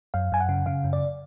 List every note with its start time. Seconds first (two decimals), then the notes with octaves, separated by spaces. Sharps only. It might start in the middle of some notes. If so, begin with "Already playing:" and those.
0.14 F#2 F5
0.32 F#2 G#5
0.40 F#5
0.49 C#3
0.66 C#3 F5
0.84 F#2
0.93 D5